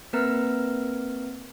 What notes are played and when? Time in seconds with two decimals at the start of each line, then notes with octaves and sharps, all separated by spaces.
0.13 A#3 C4 A#4 B4 A#5 F6